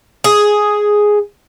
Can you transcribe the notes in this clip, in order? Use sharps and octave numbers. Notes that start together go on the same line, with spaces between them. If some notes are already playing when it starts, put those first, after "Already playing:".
G#4